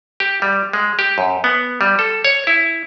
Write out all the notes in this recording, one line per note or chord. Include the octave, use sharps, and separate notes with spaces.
G4
G3
G#3
G4
F#2
B3
G3
A4
C#5
E4